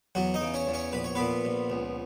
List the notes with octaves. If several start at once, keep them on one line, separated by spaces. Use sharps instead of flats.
E2 F#3 F#4
D#4 D#5
C#3
C#4 C#5
E2
C#4 C#5
A#1 B4
C#5
A#2 B3 B4
A#1
C#2